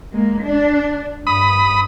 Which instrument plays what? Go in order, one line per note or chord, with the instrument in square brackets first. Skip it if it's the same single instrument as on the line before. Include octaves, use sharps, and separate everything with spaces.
[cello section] G#3 A#3
D4
[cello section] G2 [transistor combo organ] B5 D#6